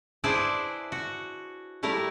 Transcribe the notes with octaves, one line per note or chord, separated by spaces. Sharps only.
D4 E4 G#4 B4 C5 D5
F#4
G3 A3 E4 A#4